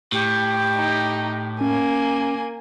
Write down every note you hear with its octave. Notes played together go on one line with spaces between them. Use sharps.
A2 G4
D#4
A#3 C#4 G#5